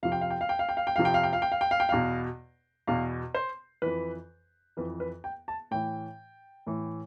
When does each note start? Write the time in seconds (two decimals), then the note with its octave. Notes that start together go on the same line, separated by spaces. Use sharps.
0.03 F2 C3 F3 F5
0.12 G5
0.21 F5
0.30 G5
0.41 F5
0.49 G5
0.59 F5
0.69 G5
0.77 F5
0.87 G5
0.96 F2 C3 F3 F5
1.05 G5
1.14 F5
1.23 G5
1.33 F5
1.42 G5
1.52 F5
1.61 G5
1.71 F5
1.80 G5
1.89 E2 B2 F5
2.87 E2 B2 F5
3.35 C5
3.82 F2 E3 B4
4.77 F2 E3 B4
5.00 B4
5.24 G5
5.48 A5
5.71 A2 E3 G5
6.67 A2 E3